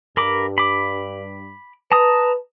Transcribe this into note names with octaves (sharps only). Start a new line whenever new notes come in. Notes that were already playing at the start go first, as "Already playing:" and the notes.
G2 A#4 B5 D6
B5 D6
B4 A5 A#5 D#6